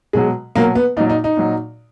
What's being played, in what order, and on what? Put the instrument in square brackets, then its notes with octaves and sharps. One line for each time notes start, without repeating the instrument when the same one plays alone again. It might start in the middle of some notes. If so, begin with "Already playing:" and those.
[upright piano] B2 F#3 G#3
B2 F#3 A#3
B3
A#2 D#4
F#3
D#4
D#4
A#2 F#3